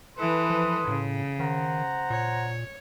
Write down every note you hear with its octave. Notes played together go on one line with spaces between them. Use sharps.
E3 A4 B4 C6 D#6
F3
A2 C#3
D#3 C5 F#5 A#5
A#2 C#5